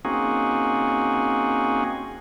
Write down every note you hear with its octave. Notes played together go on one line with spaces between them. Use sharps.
A#3 C4 C#4 D#4 F#4 G#4